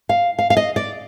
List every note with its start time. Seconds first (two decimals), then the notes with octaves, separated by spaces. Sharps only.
0.09 F5
0.39 F5
0.50 F5
0.57 D#5
0.76 D5